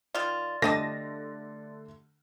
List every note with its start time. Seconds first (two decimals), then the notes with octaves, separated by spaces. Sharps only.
0.15 D#3 F4 D5
0.62 D3 A3 G4 D#5 A5 A#6